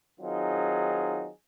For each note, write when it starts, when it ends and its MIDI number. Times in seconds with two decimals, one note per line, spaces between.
0.21 1.29 51
0.21 1.29 54
0.21 1.29 60
0.21 1.29 63
0.21 1.29 65
0.21 1.29 68